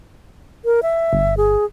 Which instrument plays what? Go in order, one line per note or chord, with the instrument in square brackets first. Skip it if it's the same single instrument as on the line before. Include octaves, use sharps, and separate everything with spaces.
[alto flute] A#4
E5
[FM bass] G1
[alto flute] G#4